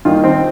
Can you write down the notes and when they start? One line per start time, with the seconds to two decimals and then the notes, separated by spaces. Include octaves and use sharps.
0.05 D#2 D#3 G3 F4
0.24 C4